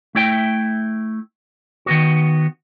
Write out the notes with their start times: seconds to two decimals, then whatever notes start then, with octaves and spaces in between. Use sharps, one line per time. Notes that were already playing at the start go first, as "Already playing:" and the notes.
0.15 A3 E4 G5
1.86 D#3 B3 F#4